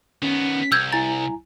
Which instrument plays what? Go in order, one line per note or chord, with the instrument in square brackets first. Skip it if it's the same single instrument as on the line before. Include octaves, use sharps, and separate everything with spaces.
[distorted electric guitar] D#3 B3 [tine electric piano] C#4
[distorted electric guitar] C2 [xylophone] E6 G6 G#6
[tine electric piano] E4 G#5 A#5 [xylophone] A6